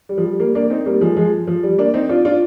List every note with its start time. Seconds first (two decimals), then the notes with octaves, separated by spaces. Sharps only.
0.09 G3
0.18 F3
0.24 G3
0.39 G3 A#3
0.55 A#3 D4
0.70 C4 D#4
0.86 G3 A#3
1.01 F3 G#3
1.17 F3 G#3
1.47 F3
1.63 G3
1.78 A#3 D4
1.94 C4 D#4
2.09 D4 F4
2.25 D4 F4